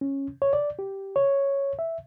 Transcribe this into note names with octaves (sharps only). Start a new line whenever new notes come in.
C#4
C#5
D5
G4
C#5
E5